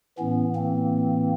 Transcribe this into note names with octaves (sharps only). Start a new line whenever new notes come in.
A2 E3 B3 C#4
A#3 C4